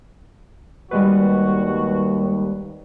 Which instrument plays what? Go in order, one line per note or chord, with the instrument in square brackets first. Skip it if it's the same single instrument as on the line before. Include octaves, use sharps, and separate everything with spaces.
[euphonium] D#2 [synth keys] G3 G#3 B4 [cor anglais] F#4